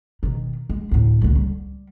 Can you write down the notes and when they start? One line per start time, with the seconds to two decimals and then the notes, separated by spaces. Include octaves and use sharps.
0.23 B2 D#3
0.70 G#3
0.91 D2 A2
1.21 C#2 D3
1.35 G3